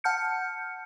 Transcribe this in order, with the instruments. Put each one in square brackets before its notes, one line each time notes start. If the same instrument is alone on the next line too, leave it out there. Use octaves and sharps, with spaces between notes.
[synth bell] F#5 A5 F6 G6 C#7